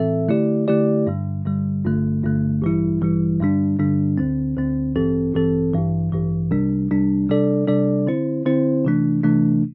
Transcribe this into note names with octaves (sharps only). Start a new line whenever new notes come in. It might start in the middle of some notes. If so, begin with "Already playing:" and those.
Already playing: A2 E3 C4 A4 E5
D3 A3 E4 G4 D5
D3 A3 E4 G4 D5
G2 D3 G3
G2 D3 G3
G1 G2 D3 A3
G1 G2 D3 A3
A1 G2 E3 G3 E4
A1 G2 E3 G3 E4
G2 D3 G3 D4
G2 D3 G3 D4
D2 D3 C4
D2 D3 C4
A1 G2 E3 C4 A4
A1 G2 E3 C4 A4
A1 G2 E3
A1 G2 E3
C2 C3 G3 D4
C2 C3 G3 D4
C3 G3 D4 A4 D5
C3 G3 D4 A4 D5
D3 C4 E4 C5
D3 C4 E4 C5
C3 E3 A3 D4
C3 E3 A3 D4